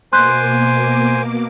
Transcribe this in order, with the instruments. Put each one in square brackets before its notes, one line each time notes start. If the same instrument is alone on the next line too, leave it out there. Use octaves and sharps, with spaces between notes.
[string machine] B2 A#3 D6 [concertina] C5 G#5 [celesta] C6 F#6 G6